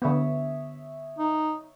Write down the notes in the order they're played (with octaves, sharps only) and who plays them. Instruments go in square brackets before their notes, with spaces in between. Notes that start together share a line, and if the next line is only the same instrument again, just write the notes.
[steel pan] D3 B3 [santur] C#5 E5 D#6
[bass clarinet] D#4